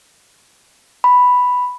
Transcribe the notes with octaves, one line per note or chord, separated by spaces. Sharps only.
B5